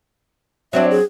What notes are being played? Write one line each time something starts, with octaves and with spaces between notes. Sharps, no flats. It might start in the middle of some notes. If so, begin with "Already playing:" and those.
F#3 C4 D4 E5
G#4